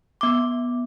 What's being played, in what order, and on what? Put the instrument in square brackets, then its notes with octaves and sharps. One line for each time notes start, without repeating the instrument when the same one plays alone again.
[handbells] B3 D6